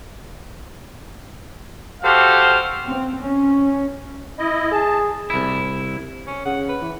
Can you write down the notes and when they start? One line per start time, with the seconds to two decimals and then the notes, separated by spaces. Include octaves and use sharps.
2.02 F#4 G4 A4 C5 F5
2.84 C4
3.22 C#4
4.39 E4 D#5
4.72 G#4 A5
5.30 C2 E4
6.27 C#4
6.45 C#3 F#5
6.69 B4
6.82 E3